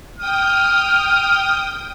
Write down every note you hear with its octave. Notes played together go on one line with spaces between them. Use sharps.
G5 D#6 F6